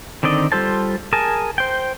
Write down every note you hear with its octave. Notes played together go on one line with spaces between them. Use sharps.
D3 D#3 C4 D5 D#5
G3 F4 A4 C5 A5
G#4 A#4 G#5 A5
C5 G5